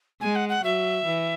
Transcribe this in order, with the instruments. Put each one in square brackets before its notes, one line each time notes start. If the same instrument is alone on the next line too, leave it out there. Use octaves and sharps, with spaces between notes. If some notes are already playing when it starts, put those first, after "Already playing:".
[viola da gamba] G#3 [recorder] G#5
[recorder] F#5
F#5
[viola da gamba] F#3 [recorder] E5
[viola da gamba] E3